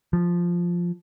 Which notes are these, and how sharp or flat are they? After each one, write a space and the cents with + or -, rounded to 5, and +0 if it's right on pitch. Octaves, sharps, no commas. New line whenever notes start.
F3 +0